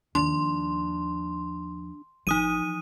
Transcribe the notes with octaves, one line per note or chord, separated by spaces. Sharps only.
D#2 F3 D4 C6
A1 E3 F3 D#4 D#6 D#7